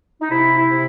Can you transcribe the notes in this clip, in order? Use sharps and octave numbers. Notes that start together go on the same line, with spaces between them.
D#4
C3 E4
E4
C3